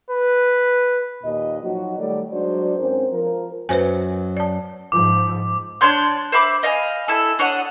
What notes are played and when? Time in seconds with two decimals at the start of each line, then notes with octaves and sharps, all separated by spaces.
0.10 B4
1.23 D#2 A#2 D#5
1.63 F3 F#3 D#4 F#4
1.98 D#3 G3 A3 A4 C#5 D5
2.32 F#3 G#3 D4 F#4 C5 D5
2.78 G#2 C4 C#4 A#4 C5
3.12 F3 A#4
3.69 F#2 F#3 B4 C5 G#5
4.37 D5 A5
4.92 G#2 F3 D6
5.81 D4 C#5 C6 G6
6.32 C5 E5 B5 D6
6.63 D#5 F5 G#5
7.08 E4 A4
7.39 D4 C#5 D#5 F#5